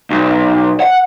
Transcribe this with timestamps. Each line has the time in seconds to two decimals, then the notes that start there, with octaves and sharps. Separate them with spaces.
0.10 B1
0.80 F#5